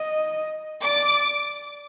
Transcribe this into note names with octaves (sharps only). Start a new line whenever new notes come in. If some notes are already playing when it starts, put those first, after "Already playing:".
Already playing: D#5
D5 D6